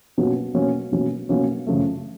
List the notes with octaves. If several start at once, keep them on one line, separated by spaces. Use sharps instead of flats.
B2 F#3 A#3 C#4 F#4
B2 F#3 A#3 C#4 F#4
B2 F#3 A#3 C#4 F#4
B2 F#3 A#3 C#4 F#4
F#2 C#3 F3 A3